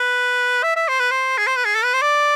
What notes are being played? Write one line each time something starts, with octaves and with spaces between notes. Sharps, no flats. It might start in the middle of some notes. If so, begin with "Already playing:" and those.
Already playing: B4
E5
E5
C5
B4
C5
G#4
C5
B4
G#4
A4
B4
C5
D5